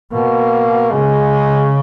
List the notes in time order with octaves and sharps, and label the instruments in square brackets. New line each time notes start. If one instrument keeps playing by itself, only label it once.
[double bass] B2 [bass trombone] A#3
[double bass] C#3 [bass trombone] G#3